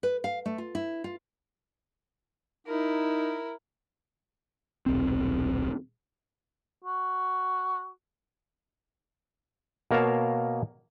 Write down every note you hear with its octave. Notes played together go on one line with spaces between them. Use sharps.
B4
F5
A3
F4
E4
F4
D#4 E4 A#4
D#1 B1 C4
F#4
B2 A#3 A#4 C#5 F5 A5